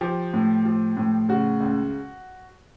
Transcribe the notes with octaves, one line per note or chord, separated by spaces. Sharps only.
F3 G4
A2
F3
A2
C#3 F#4
C#2